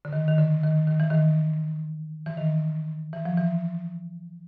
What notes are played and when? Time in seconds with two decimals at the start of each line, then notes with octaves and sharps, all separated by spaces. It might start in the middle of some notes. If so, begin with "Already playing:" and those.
0.05 D3
0.13 D#3
0.28 D#3
0.38 D3
0.63 D#3
0.87 D#3
1.00 E3
1.10 D#3
2.26 E3
2.37 D#3
3.13 E3
3.25 F3
3.37 E3